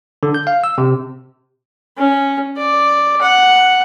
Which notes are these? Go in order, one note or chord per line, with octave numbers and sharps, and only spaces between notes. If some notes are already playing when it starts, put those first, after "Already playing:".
D3
G6
F5
E6
C3
C#4
D5
F#5